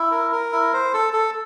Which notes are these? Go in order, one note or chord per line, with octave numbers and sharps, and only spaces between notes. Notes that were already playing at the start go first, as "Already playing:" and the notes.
Already playing: E4
A#4
A#4
E4
C5
A4
A4